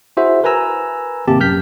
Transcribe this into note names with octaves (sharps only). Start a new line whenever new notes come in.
E4 F#4 G#4 C5 E5
A#4 B4 G#5 A#5 E6
G#1 C3 A#3 G4 A5
F#2 F6 G6 B6